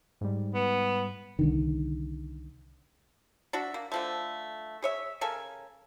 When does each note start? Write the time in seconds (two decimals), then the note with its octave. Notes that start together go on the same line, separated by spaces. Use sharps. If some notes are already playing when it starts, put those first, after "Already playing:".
0.21 G#2 G3
0.55 B3
1.39 C2 D3 D#3
3.53 D4 F#4 E5
3.74 A#3
3.92 D3 F3 A3
4.82 G#4 C#5 E5
5.21 C#3 A4 A#4 G#5